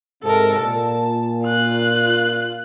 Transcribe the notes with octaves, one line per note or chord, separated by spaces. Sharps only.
G#2 C3 A4 A#4
A#2 A5
F4 F#6